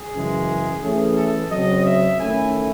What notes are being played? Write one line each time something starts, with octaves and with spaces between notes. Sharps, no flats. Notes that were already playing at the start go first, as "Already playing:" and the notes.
Already playing: G#4
F#2 C#3 E3 G#3
E3 A3 C#4 G#4
A4
C#3 F#3 C4 D#5
E5
D#3 A3 C#4 E4 G#5